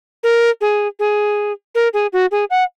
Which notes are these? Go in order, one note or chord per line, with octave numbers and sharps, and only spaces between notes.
A#4
G#4
G#4
A#4
G#4
F#4
G#4
F#5